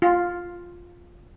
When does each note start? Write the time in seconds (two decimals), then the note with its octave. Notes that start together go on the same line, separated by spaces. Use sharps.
0.02 F4